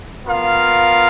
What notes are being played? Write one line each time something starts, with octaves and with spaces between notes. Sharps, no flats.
B3 F4 A#4 F5